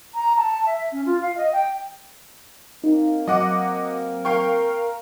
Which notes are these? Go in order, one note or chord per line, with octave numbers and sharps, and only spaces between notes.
A#5
A5
E5
C#4
F4
F5
D#5
G5
A#3 C4 D#4
F#3 D#5 F#5 D6
A#4 F5 G5 C#6